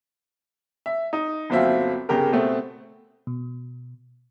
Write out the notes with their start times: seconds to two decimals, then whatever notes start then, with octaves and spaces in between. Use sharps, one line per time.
0.86 E5
1.13 D#4
1.50 G1 D#2 F#3 C4 F4 E5
2.09 G1 C#3 G4 A#4
2.33 B2 A3 C4
3.27 B2